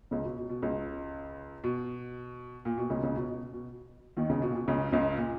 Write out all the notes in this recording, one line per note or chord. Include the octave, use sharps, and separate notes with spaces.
C#2 C#3
B2
B2
B2
C#2 C#3
B2
A#2
B2
C#2 C#3
C#2 C#3
B2
B2
B2
D#2 D#3
C#2 C#3
B2
A#2
B2
C#2 C#3
C#2 C#3
A#2